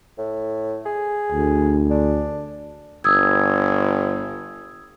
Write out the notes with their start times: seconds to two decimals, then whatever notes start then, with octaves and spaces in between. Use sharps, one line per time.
0.18 A2
0.86 G#4
1.32 D2
1.90 D4
3.04 G1 D#6 E6 G#6